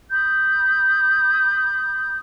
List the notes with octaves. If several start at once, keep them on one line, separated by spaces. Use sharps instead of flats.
B5 D#6 G6